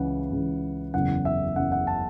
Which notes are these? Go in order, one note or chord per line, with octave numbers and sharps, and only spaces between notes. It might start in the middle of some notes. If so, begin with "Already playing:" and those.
Already playing: C#2 C#3 E3 F#5
C#2 C#3 E3
F#1 E2 C#3 F#5
E5
F#1 E2 C#3 F#5
F#5
A5